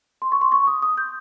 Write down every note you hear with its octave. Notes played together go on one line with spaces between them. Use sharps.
C6
C#6
C6
C#6
D#6
D#6
G6